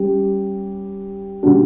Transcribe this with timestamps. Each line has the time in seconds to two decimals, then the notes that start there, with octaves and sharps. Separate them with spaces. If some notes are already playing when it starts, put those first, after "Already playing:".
Already playing: G3 C#4 G4
1.43 D3 G3 D4 F#4